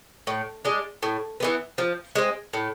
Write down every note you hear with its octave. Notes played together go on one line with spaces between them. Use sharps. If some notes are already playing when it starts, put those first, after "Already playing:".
A2
G#3 D4
A2
E3 G#3 B3
F3
G#3 C4
A2